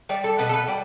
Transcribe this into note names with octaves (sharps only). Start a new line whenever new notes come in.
G3 D5
A4
B2 B4
A4
B4
G3 D5